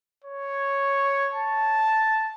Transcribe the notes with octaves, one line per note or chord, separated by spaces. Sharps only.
C#5
A5